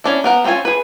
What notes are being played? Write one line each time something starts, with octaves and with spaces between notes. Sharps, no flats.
C#4 D4 E4
B3 A#4 F#5
A#3 C4 C#4 F4 G#5
G#4 B4